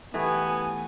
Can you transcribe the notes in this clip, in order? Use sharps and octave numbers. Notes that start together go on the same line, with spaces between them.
E3 A3 B3 G4 G#5